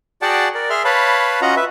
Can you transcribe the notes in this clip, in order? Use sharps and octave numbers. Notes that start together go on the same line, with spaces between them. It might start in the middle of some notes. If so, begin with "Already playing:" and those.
F#4 G#4 D5 F#5 G5 A5
A#4 D5
G#4 E5 C6 F6
B4 C#5 F5 A5 B5
C#4 F4 F#4 D#5 F#5 A#5
B4 E5